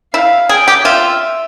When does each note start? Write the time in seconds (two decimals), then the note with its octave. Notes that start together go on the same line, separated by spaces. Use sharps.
0.13 E4 F5
0.49 G#4 G5
0.68 G4
0.85 F4 E5